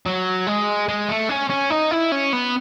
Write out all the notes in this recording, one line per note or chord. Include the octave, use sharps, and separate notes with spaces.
F#3
G#3
G#3
A3
C#4
C#4
D#4
E4
C#4
B3